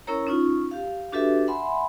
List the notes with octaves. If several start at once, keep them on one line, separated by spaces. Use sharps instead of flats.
C#4 E4 A#4 C#5 A#5
C#4 D#4 F4
G4 F5
D4 F#4 G4 A4 B4 E5
E5 F#5 G#5 B5 C6